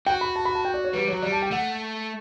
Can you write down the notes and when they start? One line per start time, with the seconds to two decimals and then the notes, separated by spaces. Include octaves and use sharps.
0.07 F#4 G5
0.21 B5
0.36 A5
0.45 B5
0.55 A5
0.65 G5
0.74 D5
0.84 C#5
0.93 G3 B4
1.08 F#3 C#5
1.22 G3 D5
1.32 A5
1.42 G5
1.51 A3 F#5